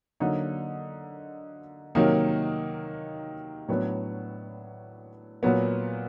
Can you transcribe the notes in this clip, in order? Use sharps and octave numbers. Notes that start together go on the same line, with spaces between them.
D3 F#3 A#3 D#4
C3 D#3 F#3 A#3 D#4
A2 F#3 B3 D4
A#2 F#3 B3